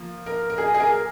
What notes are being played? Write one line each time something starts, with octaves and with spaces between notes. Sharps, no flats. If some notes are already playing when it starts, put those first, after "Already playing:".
Already playing: F3 A#3
A#4
A#4
G#4
G#4
A#4